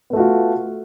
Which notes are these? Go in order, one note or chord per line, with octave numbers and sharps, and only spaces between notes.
A3 B3 F4 F#4